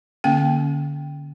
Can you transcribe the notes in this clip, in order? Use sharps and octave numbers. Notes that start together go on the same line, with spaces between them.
D3 A#3 C#4 G5